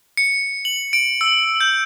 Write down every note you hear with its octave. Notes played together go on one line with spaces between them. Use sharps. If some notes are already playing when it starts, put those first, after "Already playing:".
C#7
F#7
D7
E6
G6